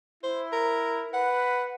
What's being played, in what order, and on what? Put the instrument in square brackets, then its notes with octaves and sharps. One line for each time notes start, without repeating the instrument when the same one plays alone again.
[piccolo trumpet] E4 [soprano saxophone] C5
[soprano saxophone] A#4
[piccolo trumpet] B4 [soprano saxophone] F#5